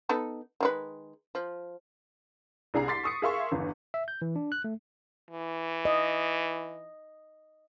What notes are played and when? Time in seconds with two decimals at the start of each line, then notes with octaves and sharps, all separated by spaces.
0.09 B3 D#4 A4
0.60 D#3 G#3 B4
1.35 F3
2.74 C2 D4 G#4 A#5 C7
2.88 F#5 C6 D6 A6 B6 C7
3.04 C#6 D#6 C#7
3.22 G#4 A#4 E5 F5 C6 C#6
3.52 G1 E2
3.94 E5
4.08 G6
4.22 E3
4.36 D4
4.52 F#6
4.64 A3
5.31 E3
5.85 D#5